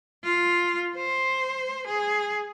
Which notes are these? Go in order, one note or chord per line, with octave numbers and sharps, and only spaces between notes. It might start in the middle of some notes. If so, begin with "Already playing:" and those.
F4
C5
G#4